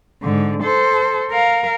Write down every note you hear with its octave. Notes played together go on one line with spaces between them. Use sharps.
G#2 D3
A4 C5
A#4 F5